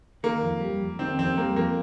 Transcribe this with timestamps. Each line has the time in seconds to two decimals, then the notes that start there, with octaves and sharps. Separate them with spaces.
0.23 D#3 A#3
0.43 F2
0.61 G3
0.80 F2
0.99 D#3 C4
1.18 F2 C4
1.37 G3 A#3
1.56 F2 A#3